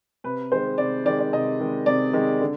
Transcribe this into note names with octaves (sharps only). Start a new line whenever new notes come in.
C3 B4
D#3 G#3 C5
C3 D5
D#3 G#3 D5
D5
C3 D#5
D#3 G#3
C3 D5
D#3 G#3
D3